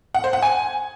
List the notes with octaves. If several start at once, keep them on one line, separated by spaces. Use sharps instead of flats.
F#5
C5
F#5
G#5